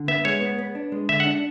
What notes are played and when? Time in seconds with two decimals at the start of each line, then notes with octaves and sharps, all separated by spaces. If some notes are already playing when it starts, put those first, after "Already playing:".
Already playing: D3
0.08 B3 E5
0.25 G#3 C#5
0.42 B3
0.59 B3
0.75 D4
0.92 G#3
1.09 D3 E5
1.20 F#5
1.25 D4